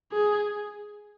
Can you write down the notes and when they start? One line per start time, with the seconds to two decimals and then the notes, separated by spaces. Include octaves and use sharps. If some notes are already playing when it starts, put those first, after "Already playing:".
0.12 G#4